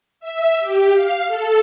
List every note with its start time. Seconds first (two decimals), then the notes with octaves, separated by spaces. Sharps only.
0.20 E5
0.60 G4
0.93 F5
1.28 A4